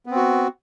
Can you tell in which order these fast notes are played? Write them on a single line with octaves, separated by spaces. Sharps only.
B3 C4 F#4